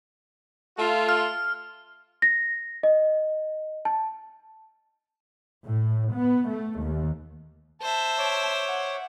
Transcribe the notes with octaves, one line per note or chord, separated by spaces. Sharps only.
A3 F4
F6
A#6
D#5
A5
A2
B3
A3
D#2
C5 E5 A5
C#5 D6
F#5